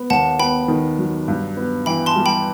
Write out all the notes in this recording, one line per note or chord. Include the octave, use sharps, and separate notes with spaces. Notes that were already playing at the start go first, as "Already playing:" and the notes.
Already playing: B3
D#2 F#5 A5
B3 G5 B5
D#3
F#3
G2
B3
E3 G5 B5
A5 C6
G3
G5 B5